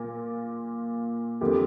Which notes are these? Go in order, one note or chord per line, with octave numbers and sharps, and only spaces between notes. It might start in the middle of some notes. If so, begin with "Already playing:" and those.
Already playing: A#2 A#3 F4
F2 D3 A#3 G4